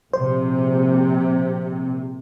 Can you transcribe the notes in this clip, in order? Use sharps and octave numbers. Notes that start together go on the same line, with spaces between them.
A#1 C3 C5